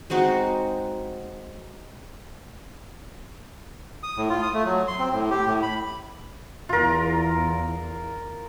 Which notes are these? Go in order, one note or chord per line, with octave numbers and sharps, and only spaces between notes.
G#3 C4 D#4 F#4
D#6
A2
F4
D#6
A3
F#3
C6
C4
A2
G4
A2
B5
E2 F4 A#4